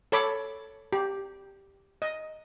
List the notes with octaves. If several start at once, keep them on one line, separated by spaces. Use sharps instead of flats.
A4 C#5 B5 D6
G4
D#5